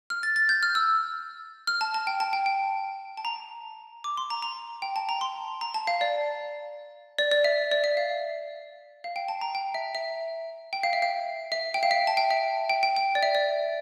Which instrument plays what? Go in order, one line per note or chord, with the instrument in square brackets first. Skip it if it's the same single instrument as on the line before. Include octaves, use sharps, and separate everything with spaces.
[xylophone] F6
A6
A6
G6
F6
E6
F6
A5
A5
G5
A5
G5
G5
A5
A#5
D6
C6
A#5
A#5
G5
A5
A#5
C6
A#5
A5
F5
D5
D5
D5
E5
D5
E5
F5
F5
G5
A5
A#5
G5
E5
E5
G5
F5
E5
F5
E5
G5
F5
E5
A5
G5
E5
G5
G5
G5
D5
E5
D5